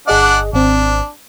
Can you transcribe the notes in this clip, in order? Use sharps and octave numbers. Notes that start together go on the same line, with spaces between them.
G1 D4 G#4 D5 D#5 F#5
G#1 C4 D4